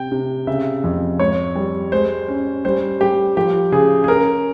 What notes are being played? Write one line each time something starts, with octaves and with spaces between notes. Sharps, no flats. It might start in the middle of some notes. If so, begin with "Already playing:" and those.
Already playing: C3 G5
C3
C#3 E5
F2
G#2 C#5
G3
G#3 C5
C#4
G3 C5
G3 G4
F3 G4
C#3 G#4
G#4
C#4 A#4